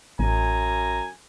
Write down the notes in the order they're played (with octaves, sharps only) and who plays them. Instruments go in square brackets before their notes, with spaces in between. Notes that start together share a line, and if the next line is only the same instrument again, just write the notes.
[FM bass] A1 [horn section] F#2 G#5 A#5